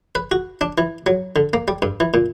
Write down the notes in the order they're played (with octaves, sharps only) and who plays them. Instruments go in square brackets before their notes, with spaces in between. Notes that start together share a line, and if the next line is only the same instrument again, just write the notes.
[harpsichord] B4
F#4
D4
E3
F#3
D3
A#3
G3
G2
E3
A#2